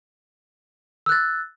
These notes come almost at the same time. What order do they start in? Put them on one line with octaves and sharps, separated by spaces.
E6 F#6 A6